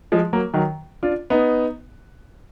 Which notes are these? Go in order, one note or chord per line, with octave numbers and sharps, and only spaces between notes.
F3 G#3
F#3 A#3
D#3 F#3
D4 F4
B3 D#4